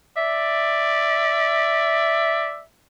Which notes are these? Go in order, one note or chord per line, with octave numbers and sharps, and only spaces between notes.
D5 E5